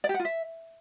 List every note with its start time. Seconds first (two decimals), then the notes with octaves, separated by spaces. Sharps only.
0.04 D5
0.09 G4
0.14 F#5
0.20 F4
0.25 E5